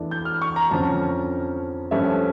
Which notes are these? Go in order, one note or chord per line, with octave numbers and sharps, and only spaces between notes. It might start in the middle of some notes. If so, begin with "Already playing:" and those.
Already playing: E2 E3 A3 D4
G6
F6
C#6
A#5
F2 D3 F3 C#4 A5
G2 F3 A3 C#4 E5